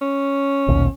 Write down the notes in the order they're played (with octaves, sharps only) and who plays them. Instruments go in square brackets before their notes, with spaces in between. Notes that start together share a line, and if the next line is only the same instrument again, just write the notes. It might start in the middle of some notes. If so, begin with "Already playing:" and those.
[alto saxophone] C#4
[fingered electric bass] A#1 D#2 B2